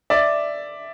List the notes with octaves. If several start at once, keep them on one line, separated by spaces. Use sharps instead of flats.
D5 E5